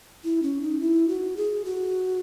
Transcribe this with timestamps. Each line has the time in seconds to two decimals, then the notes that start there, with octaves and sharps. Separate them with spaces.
0.24 E4
0.43 C#4
0.62 D#4
0.80 E4
1.08 F#4
1.37 G#4
1.65 F#4